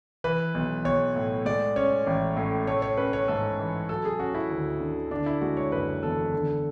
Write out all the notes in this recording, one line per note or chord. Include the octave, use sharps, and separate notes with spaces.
E3 B4
B1
B1 C#5
A2
G#3 D5
C#4 C#5
A1
A2
A3 C#5
C#5
C#4 B4
C#5
G#2 A4
E3
F#3 A4
G#4
C#4 F#4
E4
D2
D3
D3 D4
E4
G#3 F#4
C#5
F#1 B4
E2 A4
D3